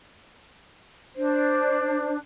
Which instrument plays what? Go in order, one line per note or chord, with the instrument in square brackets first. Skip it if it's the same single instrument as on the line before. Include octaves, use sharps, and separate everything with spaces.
[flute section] D4 [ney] C5